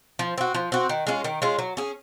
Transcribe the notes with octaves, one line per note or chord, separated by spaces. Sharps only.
F3
C4 F#4
F3
C4 F#4
D#3
G#3 C#4 F4
D#3
G#3 C#4 F4
F#3
C#4 G#4